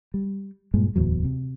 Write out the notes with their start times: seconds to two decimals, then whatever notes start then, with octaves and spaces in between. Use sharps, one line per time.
0.14 G3
0.74 G2 A#2 G#3
0.96 D1 B1 E2 F#3
1.24 C3